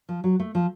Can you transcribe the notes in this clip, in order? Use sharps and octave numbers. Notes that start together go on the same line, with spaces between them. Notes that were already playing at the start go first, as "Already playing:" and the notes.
F3
F#3
A3
F3